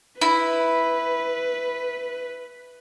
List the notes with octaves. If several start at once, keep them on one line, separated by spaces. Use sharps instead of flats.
E4 B4